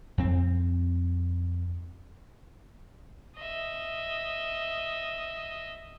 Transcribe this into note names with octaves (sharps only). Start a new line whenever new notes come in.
F2 C4
D#5 E5